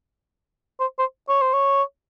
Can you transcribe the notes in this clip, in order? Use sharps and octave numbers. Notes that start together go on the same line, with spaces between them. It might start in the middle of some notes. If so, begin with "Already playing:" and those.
C5
C5
C#5
C5
C#5